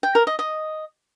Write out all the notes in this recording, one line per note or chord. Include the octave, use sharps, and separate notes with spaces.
G5
A#4
D#5
D#5